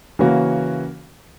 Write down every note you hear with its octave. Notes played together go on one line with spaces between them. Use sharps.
C#3 E3 A#3 C#4 F#4